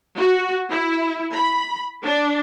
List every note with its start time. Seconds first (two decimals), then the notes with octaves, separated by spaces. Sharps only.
0.18 F#4
0.69 E4
1.33 B5
2.03 D4